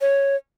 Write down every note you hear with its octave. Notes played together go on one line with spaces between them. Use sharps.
C#5